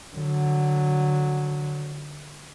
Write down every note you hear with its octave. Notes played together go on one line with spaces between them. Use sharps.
D3 F#3